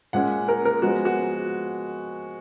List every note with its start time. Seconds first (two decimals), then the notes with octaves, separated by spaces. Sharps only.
0.13 A#2 G#3 C#4 F#5
0.48 A#4
0.65 A#4
0.82 F3 G#3 B3 F#4
1.05 F#4